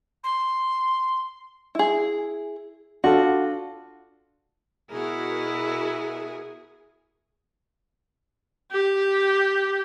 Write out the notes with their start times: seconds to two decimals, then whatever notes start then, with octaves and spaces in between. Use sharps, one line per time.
0.23 C6
1.75 E4 G#4
3.04 D4 F4 F#4 A4
4.92 B2 E4 F#4 G#4 A#4
8.72 G4